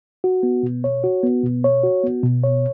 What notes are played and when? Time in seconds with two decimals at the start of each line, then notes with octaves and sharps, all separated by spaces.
0.24 F#4
0.43 B3
0.63 B2
0.84 C#5
1.04 F#4
1.23 B3
1.43 B2
1.64 C#5
1.83 F#4
2.03 B3
2.23 B2
2.44 C#5